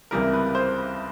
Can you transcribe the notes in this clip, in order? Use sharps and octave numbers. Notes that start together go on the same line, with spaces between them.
C#2 C3 E3 G3 A#4
B4
C5